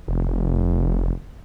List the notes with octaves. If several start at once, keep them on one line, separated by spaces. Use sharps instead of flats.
F1